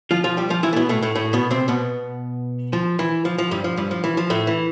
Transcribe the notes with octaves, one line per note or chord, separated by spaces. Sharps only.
F3 F4
F3 F4
G3 G4
F3 F4
E3 E4
A3
B2 B3
A2 A3
A2 A3
A2 A3
B2 B3
C3 C4
B2 B3
F3
E3
F3
F3
G2 G3
F3
G2 G3
F3
E3
F3
A2 A3
E3